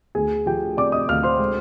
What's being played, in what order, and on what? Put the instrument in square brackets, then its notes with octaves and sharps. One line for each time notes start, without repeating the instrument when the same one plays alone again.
[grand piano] D2 G#4 G#5
F3 G4 G5
C3 D5 D6
D#5 D#6
D2 F5 F6
C5 C6
G#3